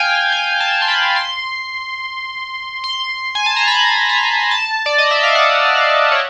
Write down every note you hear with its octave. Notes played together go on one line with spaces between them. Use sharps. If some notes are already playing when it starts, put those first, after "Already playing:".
Already playing: F5 G5 G#5
G#5
A5
C6
B5
C6
C6
G#5
A5
A#5
B5
A#5
A5
D5
D#5
E5
F5
F#5
F5
C#5